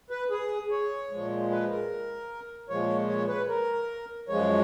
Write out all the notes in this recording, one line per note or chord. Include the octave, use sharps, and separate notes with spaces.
B4
G#4
C#5
A#2 F3 G#3
B4
A#4
A#2 F3 G#3 C#5
C#5
B4
A#4
F#2 F3 G#3 C#5